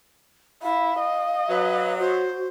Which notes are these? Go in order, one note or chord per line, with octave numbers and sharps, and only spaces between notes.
E4 F5
D#5
F#3 B4
F#4 C5